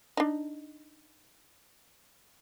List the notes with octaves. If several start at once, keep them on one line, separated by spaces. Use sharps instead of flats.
D4 D#4